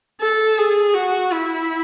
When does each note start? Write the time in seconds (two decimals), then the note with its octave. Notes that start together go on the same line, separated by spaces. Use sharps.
0.20 A4
0.58 G#4
0.94 F#4
1.32 E4